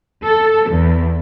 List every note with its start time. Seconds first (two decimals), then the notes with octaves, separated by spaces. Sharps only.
0.24 A4
0.71 E2